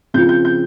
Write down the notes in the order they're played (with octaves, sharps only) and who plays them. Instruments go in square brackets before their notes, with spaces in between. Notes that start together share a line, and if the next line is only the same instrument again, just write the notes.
[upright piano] C#3 F3 C4 F4 G6
G6
G6